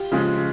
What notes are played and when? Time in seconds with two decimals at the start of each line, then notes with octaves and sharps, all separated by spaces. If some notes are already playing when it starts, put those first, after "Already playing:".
Already playing: F4 G4
0.12 C#3 F3 G#3